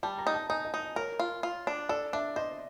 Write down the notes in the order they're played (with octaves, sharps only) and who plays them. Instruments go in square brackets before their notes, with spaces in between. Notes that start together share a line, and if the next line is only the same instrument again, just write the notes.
[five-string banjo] G3 [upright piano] A5
[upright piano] A#5
[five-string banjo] D#4
[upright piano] A5
[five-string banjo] D#4 [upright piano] G#5
[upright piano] D#5
[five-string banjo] D#4
[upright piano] D#5
[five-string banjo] A#4 [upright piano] C#5
[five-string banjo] F4
F4
D4
[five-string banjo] A4 [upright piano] D5
[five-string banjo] D4 [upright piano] E5
[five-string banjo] C5 [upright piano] D#5